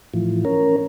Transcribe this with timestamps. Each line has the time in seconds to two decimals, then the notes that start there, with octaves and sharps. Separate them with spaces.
0.14 A2 E3 F3
0.45 C#4 A#4